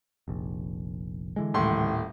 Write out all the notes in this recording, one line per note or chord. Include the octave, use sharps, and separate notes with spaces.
F1 A#1
D3 E3 G#3
D#1 A2 C6